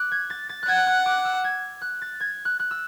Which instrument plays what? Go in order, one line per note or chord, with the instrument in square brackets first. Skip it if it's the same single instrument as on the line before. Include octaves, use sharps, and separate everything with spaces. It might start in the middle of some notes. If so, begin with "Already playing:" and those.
Already playing: [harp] D6 F#6
G#6
A6
A6
F#6
[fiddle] F#5 [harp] G#6
[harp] F#6
D6
E6
G#6
F#6
A6
G#6
F#6
F#6
E6